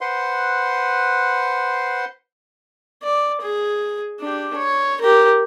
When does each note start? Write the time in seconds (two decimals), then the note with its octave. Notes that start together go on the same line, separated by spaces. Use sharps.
0.01 B4 C5 F#5 C6
3.03 D5
3.42 G#4
4.20 D4 G4
4.57 C#5
5.01 G4 A#4